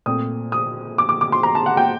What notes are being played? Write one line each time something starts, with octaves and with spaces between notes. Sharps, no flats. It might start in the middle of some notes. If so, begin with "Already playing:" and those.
A#2 A3 C4 D#6
D#6
D6
D6
D6
C6
A#5
A5
F#5
G5